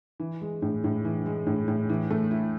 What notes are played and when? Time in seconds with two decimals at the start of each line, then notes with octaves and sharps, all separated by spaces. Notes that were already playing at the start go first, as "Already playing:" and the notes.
0.20 E3
0.41 G#3
0.62 A2
0.84 A2
1.05 E3
1.26 G#3
1.47 A2
1.68 A2
1.89 E3
2.10 A3
2.31 E4